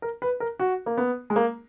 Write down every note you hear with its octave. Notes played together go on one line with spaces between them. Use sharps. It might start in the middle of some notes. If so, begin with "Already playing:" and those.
A#4
B4
A#4
F#4
A#3
B3
G#3
A#3